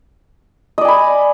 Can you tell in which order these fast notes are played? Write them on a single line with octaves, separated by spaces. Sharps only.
D#5 D5 G#5 B5